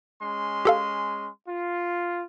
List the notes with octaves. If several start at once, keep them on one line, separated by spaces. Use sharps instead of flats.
G#3 C#4 C6
G4 A4 F5
F4